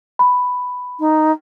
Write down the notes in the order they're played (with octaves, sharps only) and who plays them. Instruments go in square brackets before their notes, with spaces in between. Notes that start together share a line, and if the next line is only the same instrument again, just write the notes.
[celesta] B5
[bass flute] D#4